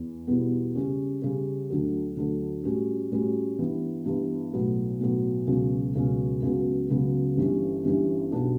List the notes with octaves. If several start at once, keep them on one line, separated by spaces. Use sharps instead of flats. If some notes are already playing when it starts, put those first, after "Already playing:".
Already playing: E2
E2 B2 G3 B3 E4
C#3 G3 C#4
C#3 G3 C#4
D2 D3 F#3
D2 D3 F#3
A2 G3 C#4 F#4
A2 G3 C#4 F#4
G2 E3 B3
G2 E3 B3
B1 A2 F#3 B3
B1 A2 F#3 B3
C#2 B2 F#3 C#4
C#2 B2 F#3 C#4
C#2 C#3 F#3 B3 F#4
C#2 C#3 F#3 B3 F#4
G1 G2 E3 G3 C#4
G1 G2 E3 G3 C#4
B1 B2 G3 B3 D4